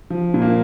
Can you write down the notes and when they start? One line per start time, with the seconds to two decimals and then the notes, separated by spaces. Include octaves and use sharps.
0.10 F3
0.34 A#2
0.42 A#3